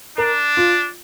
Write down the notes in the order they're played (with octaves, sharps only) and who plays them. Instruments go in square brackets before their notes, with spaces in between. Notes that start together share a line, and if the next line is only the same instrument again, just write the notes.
[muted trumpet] D4 [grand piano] A#4
[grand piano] F4